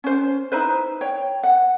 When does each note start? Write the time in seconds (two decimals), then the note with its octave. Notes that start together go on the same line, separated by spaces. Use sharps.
0.04 C#4 C5
0.52 D#4 E4 B4 C5
1.01 C#5 G5
1.43 F#5